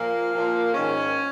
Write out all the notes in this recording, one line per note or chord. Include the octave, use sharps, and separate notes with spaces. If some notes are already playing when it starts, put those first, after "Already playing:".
Already playing: A#2 F3 A#3
A#2 F3
G#2 D#3 C#4